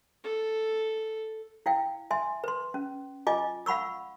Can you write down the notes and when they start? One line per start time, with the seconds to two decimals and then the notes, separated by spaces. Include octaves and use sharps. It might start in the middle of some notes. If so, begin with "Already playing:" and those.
0.24 A4
1.66 E4 F5 G5
2.11 E5 G#5 C6
2.44 B4 C6
2.74 C#4
3.27 F4 D#5 G#5 D6
3.66 F5 F#5 B5 C#6 E6